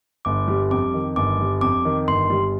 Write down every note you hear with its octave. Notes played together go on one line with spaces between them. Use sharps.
G1 D6
G3
F2 D6
D#3
G1 D6
G3
F2 D6
D#3
G1 C6
G3